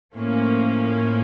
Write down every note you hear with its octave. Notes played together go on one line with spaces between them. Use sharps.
A2 F3 A#3 C#4